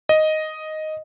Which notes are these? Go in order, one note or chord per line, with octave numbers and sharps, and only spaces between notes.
D#5